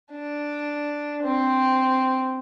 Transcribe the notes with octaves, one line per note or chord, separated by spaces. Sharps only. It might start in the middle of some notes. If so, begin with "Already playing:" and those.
D4
C4